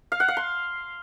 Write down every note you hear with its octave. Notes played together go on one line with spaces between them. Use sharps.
F5
F#5
F5
C6